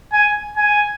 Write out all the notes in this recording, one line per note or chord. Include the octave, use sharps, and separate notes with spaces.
G#5
G#5